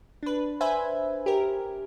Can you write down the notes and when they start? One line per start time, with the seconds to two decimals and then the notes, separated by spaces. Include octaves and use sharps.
0.23 D4 B4
0.61 B4 C5 E5 G#5
1.26 G4 A#4